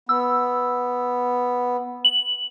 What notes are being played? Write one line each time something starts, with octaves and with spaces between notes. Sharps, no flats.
B3 E6
F#7